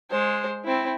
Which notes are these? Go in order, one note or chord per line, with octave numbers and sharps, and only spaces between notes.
G#3 C5
C4 E4